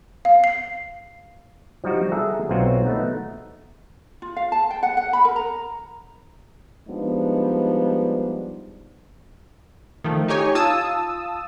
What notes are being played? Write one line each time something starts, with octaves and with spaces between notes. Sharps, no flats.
F5
C7
F3 G3 D#4 F#4
G#4 A4 E5 F#5 A#5
B1 C4 F4 F#4
A3 B3 D#4
F4
F5
A5
G5
F#5
F#5
B5
A#4
A#5
F3 G3 G#3 B3 D4 D#4
D#3 F3 A3
D#4 G4 C#5 G#5
F4 A5 D#6 E6